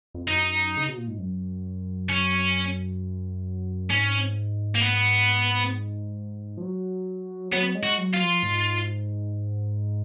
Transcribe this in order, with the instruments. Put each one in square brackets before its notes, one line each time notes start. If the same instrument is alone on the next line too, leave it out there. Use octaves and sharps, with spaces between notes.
[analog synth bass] F2
[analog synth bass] F#2 [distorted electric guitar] D#4
[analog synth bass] C#3
B2
A#2
G#2
F#2
[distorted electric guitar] C#4
[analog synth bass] G#2 [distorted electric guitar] C#4
[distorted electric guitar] A#3
B3
[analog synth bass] F3
F#3
[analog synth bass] F#3 [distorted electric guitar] B3
[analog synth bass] G#3
[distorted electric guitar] F#4
[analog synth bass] F#3
[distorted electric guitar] F4
[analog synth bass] F3
G#2